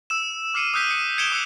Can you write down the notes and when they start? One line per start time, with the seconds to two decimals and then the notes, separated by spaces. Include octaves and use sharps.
0.10 E6 E7
0.54 D6 F6 C7 C#7 D#7
0.74 D#6 E6 F#6 G6 B6 D#7
0.91 C#7
1.18 G#6 C#7 D7 E7 F7 G7
1.32 D#6 E6 F#6 C#7